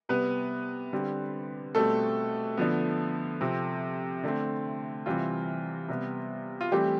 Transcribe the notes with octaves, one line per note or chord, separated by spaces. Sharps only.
C3 G3 B3 B4
D3 G3 C4
B2 G3 A3 C4 A4
D3 F3 B3
C3 F3 C4
D3 A3 C4
C3 E3 G3 C4 F4
C3 G3 B3
F4
E3 G3 A3 C4 G4